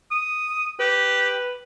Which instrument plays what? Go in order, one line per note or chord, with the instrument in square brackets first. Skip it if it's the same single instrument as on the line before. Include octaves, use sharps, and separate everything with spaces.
[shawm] D#6
[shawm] G4 [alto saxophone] B4